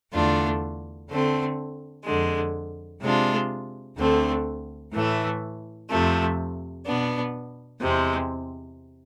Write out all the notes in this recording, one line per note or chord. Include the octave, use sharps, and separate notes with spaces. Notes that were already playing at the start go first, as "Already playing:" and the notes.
E2 D3 A3 D4 F4
D3 A3 C4
F2 D3 G#3
C3 G#3 D4 F4
D2 D3 A3 C4
A2 E3 A3
F2 C3 F3 A3
B2 B3 D4
E2 C3 G#3 C4